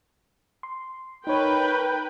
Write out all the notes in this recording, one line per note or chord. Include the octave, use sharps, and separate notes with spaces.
C6
D#4 A#4 B4 C#5 G5